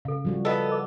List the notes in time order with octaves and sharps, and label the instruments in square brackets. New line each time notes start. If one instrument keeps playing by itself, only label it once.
[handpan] C#3 [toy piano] A4 F5
[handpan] F3 G3 F#4
[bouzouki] B3 A4 [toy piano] D#5 F5 E6
[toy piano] A#4 D#5 D6